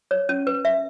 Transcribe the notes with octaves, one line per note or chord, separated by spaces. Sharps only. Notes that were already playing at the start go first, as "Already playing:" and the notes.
C#5
C#4
B4
E5